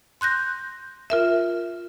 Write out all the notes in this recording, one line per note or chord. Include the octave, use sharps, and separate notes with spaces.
C6 F#6 G6 A#6
F4 A#4 E5